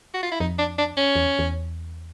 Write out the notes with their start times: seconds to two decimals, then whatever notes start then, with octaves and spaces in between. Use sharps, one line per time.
0.14 F#4
0.23 F4
0.32 E4
0.40 F2 D#4
0.59 D4
0.78 D4
0.97 C#4
1.16 E2
1.39 E2